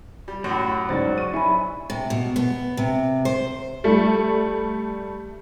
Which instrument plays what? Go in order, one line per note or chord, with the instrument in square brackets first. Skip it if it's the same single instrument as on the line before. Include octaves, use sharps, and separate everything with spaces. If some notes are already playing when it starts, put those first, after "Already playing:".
[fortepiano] G3
[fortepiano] F#2 A2 [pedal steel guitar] F#3
[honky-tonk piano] C#2 G#2 A6 [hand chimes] C5 D5
[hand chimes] C#6 [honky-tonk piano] D#7
[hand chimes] D#4 G#5 B5 [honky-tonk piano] E4
[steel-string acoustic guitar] C3
B2
B3
C3
C5
[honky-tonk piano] G3 A3